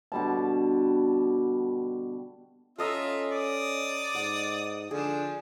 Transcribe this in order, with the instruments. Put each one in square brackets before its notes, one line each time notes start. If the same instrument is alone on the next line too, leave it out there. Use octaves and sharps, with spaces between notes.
[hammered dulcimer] B2 D3 G3 A5
[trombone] C#4 [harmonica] F4 E5 [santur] A4 D#5 A#5
[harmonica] D5 D#6
[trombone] G#2 [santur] F#5
[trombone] D3 [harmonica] F3 D4 [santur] G#4